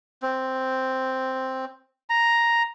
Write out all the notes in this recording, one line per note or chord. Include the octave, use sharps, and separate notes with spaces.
C4
A#5